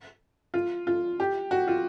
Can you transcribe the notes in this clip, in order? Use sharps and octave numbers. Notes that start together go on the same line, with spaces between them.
F4
F4
G4
F#4
F4